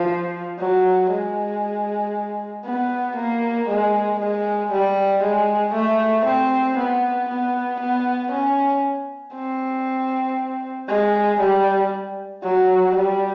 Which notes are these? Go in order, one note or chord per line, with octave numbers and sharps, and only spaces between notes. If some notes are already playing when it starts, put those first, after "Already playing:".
Already playing: F3
F#3
G#3
B3
A#3
G#3
G#3
G3
G#3
A3
C4
B3
B3
B3
C#4
C4
G#3
G3
F#3
G3